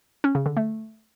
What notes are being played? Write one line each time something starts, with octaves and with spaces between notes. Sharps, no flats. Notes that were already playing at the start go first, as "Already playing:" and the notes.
C#4
C#3
D3
A3